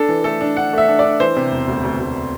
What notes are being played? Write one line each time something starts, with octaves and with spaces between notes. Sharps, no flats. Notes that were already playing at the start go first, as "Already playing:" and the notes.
Already playing: D4 A4
E3
A3 A4
D4
D4 F#5
A3 E5
D4
D5
D4
E3 C5
C3
E1
D2
D2
D2